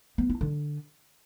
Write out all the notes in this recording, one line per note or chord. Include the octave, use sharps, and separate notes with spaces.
B3
E4
D3